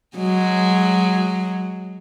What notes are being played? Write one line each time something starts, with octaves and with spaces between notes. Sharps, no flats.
F#3 G#3